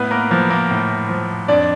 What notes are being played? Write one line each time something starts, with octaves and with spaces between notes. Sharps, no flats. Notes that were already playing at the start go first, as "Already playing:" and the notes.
Already playing: A2 B3 B4
A#3 A#4
F3 A#3 A#4
A#3 A#4
A2
F3
F2 D4 D5